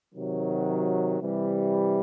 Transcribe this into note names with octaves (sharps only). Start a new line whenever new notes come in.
C3 D#3 F#3
C3 E3 G3